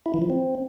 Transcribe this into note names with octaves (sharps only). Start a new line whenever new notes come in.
E4
E3
F3
C4